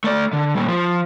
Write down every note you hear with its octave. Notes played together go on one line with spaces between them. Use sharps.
A3 D5
D3
A#2 G3
F3